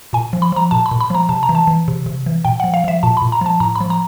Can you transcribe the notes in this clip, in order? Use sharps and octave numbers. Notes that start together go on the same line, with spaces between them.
A#2 G#5
F3
B5
F3 A#5
A#2 A5
B5
A#2
B5
F3 A#5
C3 A5
A#5
E3
A5
E3
C3
C3
E3
A#2 G5
F3 F#5
F5
F3 E5
A#2 A5
A#2 B5
A#5
F3 A5
A2 A#5
F3 B5
A#5